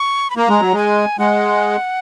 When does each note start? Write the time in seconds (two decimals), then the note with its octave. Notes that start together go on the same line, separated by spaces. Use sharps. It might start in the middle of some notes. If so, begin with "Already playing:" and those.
Already playing: C#6
0.30 B5
0.37 A#3 A#5
0.49 G#3
0.60 F#3
0.73 G#3
0.78 G#5
1.19 G#3 F#5